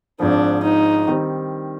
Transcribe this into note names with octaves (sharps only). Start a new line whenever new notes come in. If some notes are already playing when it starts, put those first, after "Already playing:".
G#1 G#2 F3 D4
D#4
D#3 G3 C4